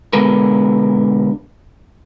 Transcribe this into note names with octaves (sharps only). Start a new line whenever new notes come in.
B2 D3 G#3 A#4 B4